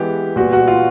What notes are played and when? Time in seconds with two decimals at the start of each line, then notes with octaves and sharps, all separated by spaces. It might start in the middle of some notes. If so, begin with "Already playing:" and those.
Already playing: E3 G#3 B3 G4
0.36 A#2 G3 B3 F#4
0.53 F#4
0.68 F4